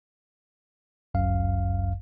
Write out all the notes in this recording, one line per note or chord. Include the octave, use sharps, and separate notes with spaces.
G1 C#2 F#2 F5